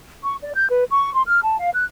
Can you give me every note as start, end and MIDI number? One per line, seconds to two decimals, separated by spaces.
0.24 0.35 85
0.42 0.51 74
0.55 0.68 91
0.69 0.84 71
0.90 1.13 85
1.13 1.23 84
1.27 1.40 89
1.42 1.58 81
1.58 1.69 77
1.73 1.84 90